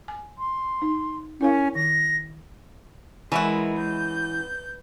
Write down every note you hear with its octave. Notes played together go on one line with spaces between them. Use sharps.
G#5
C6
D#4
C#4 E4 A#4 F5
D#3 A#6
E3 G#3 C#4 E4 F#4 A#4
G6